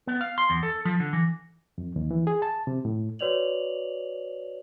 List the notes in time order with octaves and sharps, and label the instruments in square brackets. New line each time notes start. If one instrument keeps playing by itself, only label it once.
[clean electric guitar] B3
F5
C6
E2
A4
F3
D3
E3
[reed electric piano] F2
D#2
E3
G#4
A5
C3
A2
[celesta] F#4 B4 C#5 D5 F7 F#7